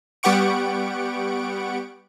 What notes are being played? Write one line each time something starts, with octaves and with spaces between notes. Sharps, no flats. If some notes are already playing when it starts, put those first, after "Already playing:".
G3 B3 G4 F#5 C#6 D7